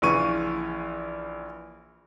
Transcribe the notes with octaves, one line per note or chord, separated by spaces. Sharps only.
A#1 C#3 E3 C#6 D#7